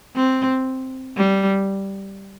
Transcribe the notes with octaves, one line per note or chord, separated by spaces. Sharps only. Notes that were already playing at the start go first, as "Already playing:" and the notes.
C4
G3